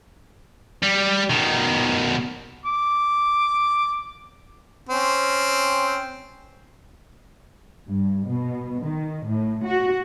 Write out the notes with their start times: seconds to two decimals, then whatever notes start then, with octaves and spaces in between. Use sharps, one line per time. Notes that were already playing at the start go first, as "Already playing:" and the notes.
0.83 G3
1.30 B2 D#3
2.65 D6
4.89 C4 C#4
7.89 G2
8.27 B2
8.83 D#3
9.27 A2
9.65 F#4